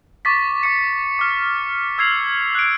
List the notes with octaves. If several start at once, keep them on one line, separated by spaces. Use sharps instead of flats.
C#6 D6 A6 B6
D6 C#7
D6 F6
E6 G#6 C7 F7
F#6 D7